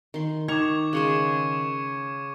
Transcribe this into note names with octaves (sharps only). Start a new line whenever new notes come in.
D#3 C6
D#3 C#6 D6 G#6 F7
C#3 G#3 G#4 C#6 C#7 E7